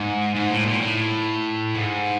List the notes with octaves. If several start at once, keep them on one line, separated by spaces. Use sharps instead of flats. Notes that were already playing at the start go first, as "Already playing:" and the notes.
Already playing: G#2
G#2
A2
A#2
A2
G#2